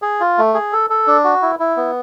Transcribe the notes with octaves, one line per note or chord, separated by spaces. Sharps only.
G#4
F4
A3
G#4
A4
A4
D4
F#4
E4
E4
B3